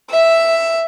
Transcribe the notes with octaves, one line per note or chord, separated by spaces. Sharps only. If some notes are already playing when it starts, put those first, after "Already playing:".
E5